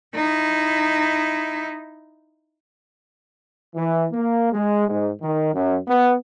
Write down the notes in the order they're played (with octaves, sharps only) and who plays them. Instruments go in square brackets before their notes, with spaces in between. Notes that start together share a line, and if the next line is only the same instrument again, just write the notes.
[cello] D#4 E4
[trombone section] E3
A#3
G#3
G#2
D#3
F#2
B3